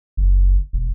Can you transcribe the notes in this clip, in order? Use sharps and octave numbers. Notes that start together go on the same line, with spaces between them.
F#1
E1